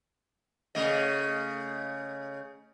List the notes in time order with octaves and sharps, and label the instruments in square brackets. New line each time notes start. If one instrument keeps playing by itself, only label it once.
[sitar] C#3 A3 D#5